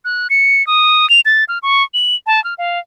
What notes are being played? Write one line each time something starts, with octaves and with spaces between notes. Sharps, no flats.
F#6
C#7
D#6
F7
A6
F6
C#6
F#7
A5
F6
F5